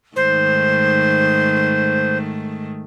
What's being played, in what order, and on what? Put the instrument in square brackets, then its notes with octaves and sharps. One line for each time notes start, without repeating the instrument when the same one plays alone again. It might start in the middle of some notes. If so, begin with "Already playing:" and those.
[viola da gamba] G#2 D#3 A3 [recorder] C5